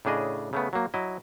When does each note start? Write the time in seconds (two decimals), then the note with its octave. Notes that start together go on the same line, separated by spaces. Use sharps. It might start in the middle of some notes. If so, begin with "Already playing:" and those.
0.05 A2 C#3 D4 G#4 D#5
0.53 C#3 A3 B3
0.73 F#3 A#3
0.94 F#3 E4 D#5